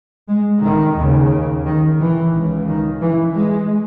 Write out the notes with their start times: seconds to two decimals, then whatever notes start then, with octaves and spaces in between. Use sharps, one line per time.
0.28 G#3
0.62 D#3
0.96 D#2 C#3
1.65 D#3
1.99 E3
2.32 C#2 C#3
2.67 D#3
3.01 E3
3.34 G#3